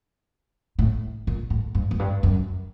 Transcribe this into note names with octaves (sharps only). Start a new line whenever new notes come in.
A2
A#2
A2
G2
F#2
G2
F#2